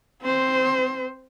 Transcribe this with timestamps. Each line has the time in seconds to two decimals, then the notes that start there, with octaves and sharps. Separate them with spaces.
0.22 C4 C5